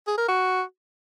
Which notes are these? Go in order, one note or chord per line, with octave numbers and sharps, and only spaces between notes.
G#4
A#4
F#4